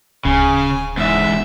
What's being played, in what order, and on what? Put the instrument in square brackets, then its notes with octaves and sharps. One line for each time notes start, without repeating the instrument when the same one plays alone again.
[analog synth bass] D1 [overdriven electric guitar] C#3 [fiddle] G#5
[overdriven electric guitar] E2 G#2 [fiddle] E5